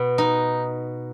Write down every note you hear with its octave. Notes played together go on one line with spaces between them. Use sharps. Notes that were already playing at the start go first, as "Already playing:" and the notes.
Already playing: B2
D#4